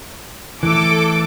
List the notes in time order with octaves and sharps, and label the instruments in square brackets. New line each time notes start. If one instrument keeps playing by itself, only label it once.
[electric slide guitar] E3 A3 [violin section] A4 D6